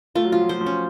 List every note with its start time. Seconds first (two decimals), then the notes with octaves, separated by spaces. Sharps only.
0.15 A3 F4
0.25 F#3
0.32 F3 F4
0.41 F#3
0.49 F3 C5
0.61 F3
0.66 C#4